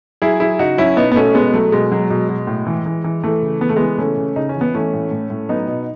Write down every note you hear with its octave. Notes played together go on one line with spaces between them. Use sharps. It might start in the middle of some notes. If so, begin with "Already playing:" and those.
F#3 E4 G#4
F#3 E4 G#4
C#3 D#4 F#4
F#3 C#4 E4
B2 B3 D#4
B3
B2 A3 C#4
B2 G#3 B3
F#3 A3
B2 G#3
F#3
B2
B2
A2
E3
E3
E3
E3 A3
C#3
E3 B3
A3
E3 G#3 B3
C#3 A3 C#4
C#3
C#3 D#4
C#4
E3
B3
E3 A3 C#4
A2
A2
A2
F#3 B3 D#4
B2